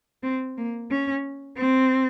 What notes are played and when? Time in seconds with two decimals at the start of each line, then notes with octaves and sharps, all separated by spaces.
0.23 C4
0.58 A#3
0.91 C#4
1.57 C4